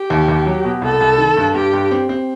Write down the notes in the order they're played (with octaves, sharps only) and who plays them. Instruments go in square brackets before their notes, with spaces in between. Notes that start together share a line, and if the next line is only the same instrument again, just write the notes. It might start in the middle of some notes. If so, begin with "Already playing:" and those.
Already playing: [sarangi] G4
[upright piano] D#2
D#2
F#3
B2
[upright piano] C2 [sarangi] A4
[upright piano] C2
D#3
G2
[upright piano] G2 [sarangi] G4
[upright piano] G2
C4
C4